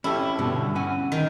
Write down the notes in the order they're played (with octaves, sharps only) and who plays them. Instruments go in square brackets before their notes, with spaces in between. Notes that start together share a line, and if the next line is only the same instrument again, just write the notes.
[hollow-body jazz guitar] C#4 G4 A4 [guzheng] E4
[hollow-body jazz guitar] G2 B2 D3
C#4 F#5 G#5
[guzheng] D#3